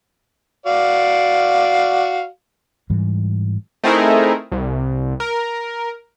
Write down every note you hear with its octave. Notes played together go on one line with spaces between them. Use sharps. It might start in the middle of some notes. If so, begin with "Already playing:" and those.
F#4 D5 F5
G#2 E3 G3
A3 C4 D#4 E4 G#4 A#4
C2
A#4